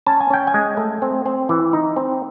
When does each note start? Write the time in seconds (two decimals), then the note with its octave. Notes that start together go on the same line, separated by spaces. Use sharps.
0.06 C#4 A5
0.20 G#5
0.30 C#4 G5
0.47 G#5
0.54 G#3
0.77 A3
1.02 C4
1.26 C4
1.49 E3
1.73 D#4
1.96 C4